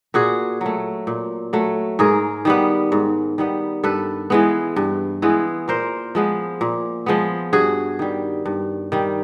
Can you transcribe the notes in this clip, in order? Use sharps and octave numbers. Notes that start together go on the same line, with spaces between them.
A#2 F#4 G#4
F#3 A3
A#2
F#3 A3
G#2 G#4 A#4
D#3 G3 B3
G#2
D#3 G3 B3
G2 A4 B4
E3 G#3 B3
G2
E3 G#3 B3
A#2 A#4 C5
F3 G#3 B3
A#2
F3 G#3 B3
G2 F#4 G#4
D#3 G3
G2
D#3 G3